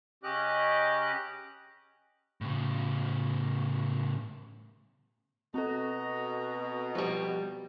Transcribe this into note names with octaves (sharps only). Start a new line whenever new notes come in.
C#3 C#4 G4 D#5 D6 F#6
A2 C#3
B2 C4 F#4 A4 D#5 A#5
F3 G3